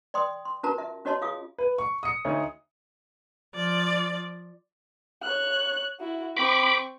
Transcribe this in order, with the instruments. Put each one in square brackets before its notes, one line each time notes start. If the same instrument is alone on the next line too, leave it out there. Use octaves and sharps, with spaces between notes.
[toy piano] D5 G5 C6 D#6
C6
C#4 F4 F#4 A#4 A5 A#5
E5
C#4 F#4 C#5 D#5 A5 C6
F4 G#4 F5 D#6
[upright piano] B4
C#6
D#6 C#7
D2 D#4 C#5
[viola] F3 D5
[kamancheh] C#5 F#6
E4 F#4
[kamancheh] C4 C#6 [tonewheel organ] B5 D6